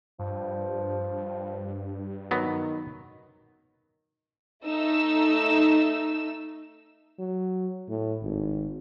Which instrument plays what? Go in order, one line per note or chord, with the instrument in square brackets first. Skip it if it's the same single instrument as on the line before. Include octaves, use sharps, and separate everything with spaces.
[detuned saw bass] G2 [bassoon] F3
[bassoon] D#3 [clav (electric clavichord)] F#3 B3
[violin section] A3 D#4 E6
[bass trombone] F#3
A2
G#1